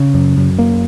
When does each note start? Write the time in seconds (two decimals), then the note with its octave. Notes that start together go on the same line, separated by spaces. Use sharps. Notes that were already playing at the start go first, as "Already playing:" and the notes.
Already playing: C#3
0.14 F#2
0.37 F#2
0.59 A#3